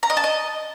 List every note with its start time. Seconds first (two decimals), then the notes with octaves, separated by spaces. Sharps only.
0.03 A#5
0.10 D#5
0.17 A5
0.24 D#5